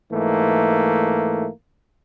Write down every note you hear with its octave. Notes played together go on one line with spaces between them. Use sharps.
G#2 E3 A3 A#3